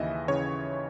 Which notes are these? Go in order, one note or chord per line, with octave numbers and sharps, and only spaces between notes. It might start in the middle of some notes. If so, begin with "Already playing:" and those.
Already playing: D#2 C#3 E3 D#5 E5
C#3 E3 C#5